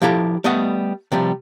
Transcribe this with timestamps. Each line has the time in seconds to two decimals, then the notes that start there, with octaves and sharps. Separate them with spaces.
0.02 F3 E4 G4 A4 A#5
0.44 G3 A3 B3 D#5 F#5
1.12 C3 F3 G3